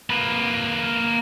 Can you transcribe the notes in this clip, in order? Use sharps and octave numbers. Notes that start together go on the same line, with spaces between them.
A#3 B4